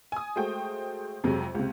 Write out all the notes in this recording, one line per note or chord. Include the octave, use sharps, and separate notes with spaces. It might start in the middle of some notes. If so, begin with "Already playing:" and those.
G#5 D#6
G#3 A3 F#4 C5 G5
F2 C3 F#3 G#3
C#2 C3